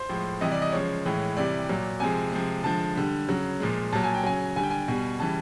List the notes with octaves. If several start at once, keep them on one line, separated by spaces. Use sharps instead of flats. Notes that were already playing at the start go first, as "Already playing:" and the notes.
Already playing: C5
A2 F3 G#3
C3 E3 G3 D#5
D5
D#5
C#3 F3 G#3 C#5
A2 E3 G#3
C3 E3 G3 D5
A#2 F#3
C3 F3 G#3 G#5
C3 F3 G#3
D3 F3 G#3 A5
D3 G3
C#3 F#3
A#2 F3 G#3
A#2 F#3 A5
G#5
G5
C#3 F#3 G#5
D3 G3 G#5
G5
G#5
B2 G3
C#3 E3 G3 A5